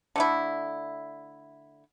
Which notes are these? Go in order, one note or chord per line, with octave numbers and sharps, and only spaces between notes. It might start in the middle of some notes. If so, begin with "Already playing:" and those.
D3 A3 E4